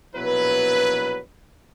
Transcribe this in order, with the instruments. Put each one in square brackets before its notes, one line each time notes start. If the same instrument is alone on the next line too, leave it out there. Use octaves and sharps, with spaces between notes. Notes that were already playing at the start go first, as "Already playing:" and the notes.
[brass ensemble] A#1 B2 F#3 E4 B4